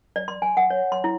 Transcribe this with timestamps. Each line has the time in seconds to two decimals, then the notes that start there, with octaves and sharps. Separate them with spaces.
0.16 D5
0.28 C6
0.42 G#5
0.57 F#5
0.70 C#5
0.92 C6
1.04 E4